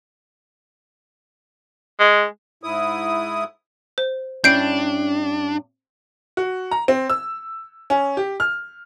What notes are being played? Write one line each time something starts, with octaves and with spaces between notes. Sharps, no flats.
G#3
G#2 E4 D#6
C5
G2 C#4 D4 E4 G6 C7 D7
F#4
A#5
C4
E6
C#4
G4
F6